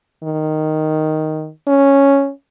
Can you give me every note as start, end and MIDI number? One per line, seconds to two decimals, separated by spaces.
0.23 1.50 51
1.67 2.31 61